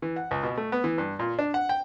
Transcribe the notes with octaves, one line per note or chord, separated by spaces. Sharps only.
E3
F#5
C#2
B2
A3
B3
E3
G2
A#2
D4
F#5
G5